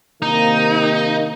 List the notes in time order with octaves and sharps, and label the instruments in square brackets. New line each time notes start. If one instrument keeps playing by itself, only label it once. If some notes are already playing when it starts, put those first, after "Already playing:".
[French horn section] C3 D#3 A#3 [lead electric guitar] D#4